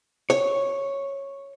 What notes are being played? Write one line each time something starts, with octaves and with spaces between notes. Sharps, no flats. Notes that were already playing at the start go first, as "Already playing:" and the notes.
C#5